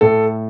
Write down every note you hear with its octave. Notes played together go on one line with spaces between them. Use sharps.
A2 A4